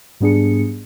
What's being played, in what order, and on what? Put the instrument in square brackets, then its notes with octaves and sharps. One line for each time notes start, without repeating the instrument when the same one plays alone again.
[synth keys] G#2 G3 B3 D4 G#4 C#7